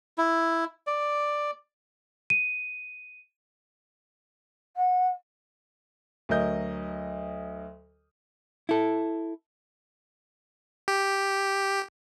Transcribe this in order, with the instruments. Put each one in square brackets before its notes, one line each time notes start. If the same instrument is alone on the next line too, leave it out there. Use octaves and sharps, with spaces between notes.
[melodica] E4
D5
[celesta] D#7
[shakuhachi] F#5
[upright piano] D2 F#3 A#4 D#5 G6
[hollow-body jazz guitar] E4 A4
[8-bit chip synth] G4